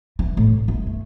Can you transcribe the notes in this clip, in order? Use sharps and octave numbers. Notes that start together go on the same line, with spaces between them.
E3
A2
D3
G1
A3